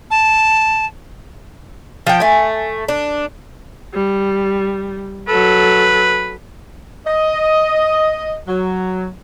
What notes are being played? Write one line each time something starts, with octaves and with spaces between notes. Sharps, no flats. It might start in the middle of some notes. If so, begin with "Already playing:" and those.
A5
F3 G5
A3 G#5
D4
G3
F#3 A4 B4
D#5
F#3